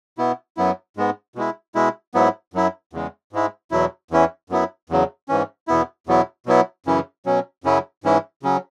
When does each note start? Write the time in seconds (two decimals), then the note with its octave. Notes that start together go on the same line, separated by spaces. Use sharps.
0.18 B2 B3 E4
0.57 F#2 F#3 B3 E4
0.97 G#2 G#3 B3
1.35 B2 G#3 E4
1.75 B2 G#3 E4
2.14 G#2 F#3 B3 E4
2.54 F#2 F#3 E4
2.93 E2 C#3 G#3
3.33 G#2 G#3 E4
3.71 E2 B2 F#3 E4
4.11 E2 E3 C#4 E4
4.50 F#2 F#3 B3 E4
4.90 E2 C#3 F#3
5.28 G#2 E3 C#4
5.68 E2 B2 B3 E4
6.07 E2 B2 F#3 B3 E4
6.46 B2 F#3 B3 E4
6.86 F#2 C#3 E3 C#4 E4
7.26 B2 F#3 C#4
7.64 F#2 C#3 F#3 C#4 E4
8.04 G#2 E3 C#4 E4
8.43 C#3 F#3 C#4